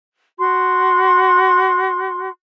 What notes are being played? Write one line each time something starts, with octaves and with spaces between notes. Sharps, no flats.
F#4 C6